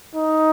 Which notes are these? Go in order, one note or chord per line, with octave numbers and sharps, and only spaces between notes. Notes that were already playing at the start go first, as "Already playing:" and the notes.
D#4